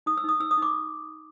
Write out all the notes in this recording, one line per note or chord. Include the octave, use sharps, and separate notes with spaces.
D#4 D#6
E6
D#4 D#6
D#4 E6
D#6
D#4 D6